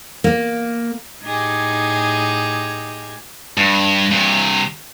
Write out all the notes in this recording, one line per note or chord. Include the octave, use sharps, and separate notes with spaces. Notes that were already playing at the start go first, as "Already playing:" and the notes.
A#3
A2 D#4 G4 G#4 G#6
G2
G2 C3